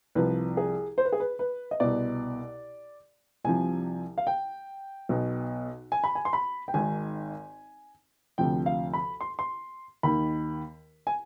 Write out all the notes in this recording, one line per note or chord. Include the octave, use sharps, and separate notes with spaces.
C2 C3 F3 B4
G#4
C5
B4
G#4
B4
B4
D#5
C2 B2 D5
C2 C3 F3 G#5
F5
G5
B1 B2
G#5
B5
G#5
C6
B5
G5
G#1 G#2 D#3 G#5
D2 C3 F3 G5
F5
B5
C6
C6
D#2 D#3 B5
G#5